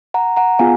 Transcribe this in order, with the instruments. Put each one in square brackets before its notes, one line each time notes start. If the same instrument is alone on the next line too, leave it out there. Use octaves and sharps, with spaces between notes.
[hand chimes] F#5 A#5
F#5 A#5
B3 F4 G#4 F5 G#5